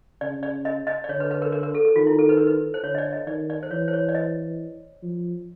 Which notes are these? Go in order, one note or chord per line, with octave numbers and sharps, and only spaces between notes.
C#3 D5
D5
D#5
D#5
D5
D3 C#5
B4
B4
A#4
A#4
A#4
A4
A4
D#3 F4
E4
A4
B4
A#4
B4
C5
D3 C#5
D#5
D5
D#5
D#3 D5
D5
C5
E3 C#5
C5
C#5
D5
D#5
F3